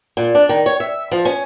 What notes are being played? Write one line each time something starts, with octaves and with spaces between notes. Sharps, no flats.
A#2
D4
D#3
C#5
E5
F3
C#4